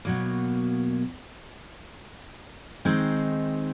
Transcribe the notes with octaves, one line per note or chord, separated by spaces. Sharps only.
B2 F#3 A#3
D#3 G#3 C4 D#4